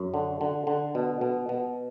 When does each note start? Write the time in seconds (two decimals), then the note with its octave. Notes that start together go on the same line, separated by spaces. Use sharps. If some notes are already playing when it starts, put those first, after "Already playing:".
Already playing: F#2
0.14 D3
0.41 D3
0.67 D3
0.95 B2
1.21 B2
1.49 B2